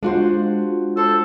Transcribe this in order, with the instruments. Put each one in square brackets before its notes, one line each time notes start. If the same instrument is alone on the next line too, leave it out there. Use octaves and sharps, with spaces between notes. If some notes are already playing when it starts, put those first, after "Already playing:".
[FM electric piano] G#3 F4 [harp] D4 F#4 C5
[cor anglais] A4 [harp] C5